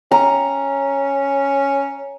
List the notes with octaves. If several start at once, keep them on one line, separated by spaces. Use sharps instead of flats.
C#4 A#5